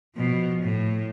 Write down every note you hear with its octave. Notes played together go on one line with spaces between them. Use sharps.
B2 F3
A2